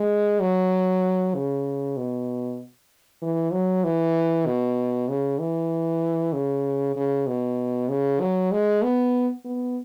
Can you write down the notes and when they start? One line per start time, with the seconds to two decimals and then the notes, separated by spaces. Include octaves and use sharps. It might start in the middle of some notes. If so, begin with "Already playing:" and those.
Already playing: G#3
0.41 F#3
1.35 C#3
1.97 B2
3.22 E3
3.52 F#3
3.84 E3
4.46 B2
5.09 C#3
5.40 E3
6.33 C#3
6.96 C#3
7.27 B2
7.89 C#3
8.20 F#3
8.52 G#3
8.83 B3
9.45 B3